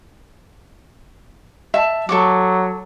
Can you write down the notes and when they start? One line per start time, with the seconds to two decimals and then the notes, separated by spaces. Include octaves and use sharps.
1.74 E5 A5
2.09 F#3 A4 C#6 D6